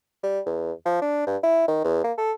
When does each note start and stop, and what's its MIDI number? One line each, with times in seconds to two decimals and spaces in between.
0.23 0.40 55
0.46 0.72 40
0.86 1.02 53
1.02 1.22 62
1.27 1.37 43
1.43 1.67 64
1.68 1.82 51
1.84 2.04 40
2.04 2.13 58
2.18 2.32 69